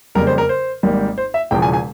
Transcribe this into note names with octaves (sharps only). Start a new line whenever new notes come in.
F2 C#3 G3 A#3 A#4
C5
A#4
C5
G#1 G#2 G3 A#3
C5
E5
E1 E2 C#3 F3 G5
G#5
G#5